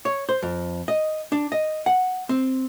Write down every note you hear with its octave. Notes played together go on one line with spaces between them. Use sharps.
C#5
C5
F2
D#5
D4
D#5
F#5
C4